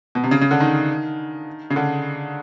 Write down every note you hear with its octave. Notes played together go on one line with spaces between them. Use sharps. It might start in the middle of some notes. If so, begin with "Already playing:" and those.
B2
C3
C#3
C#3
D3
D#3
C#3
D3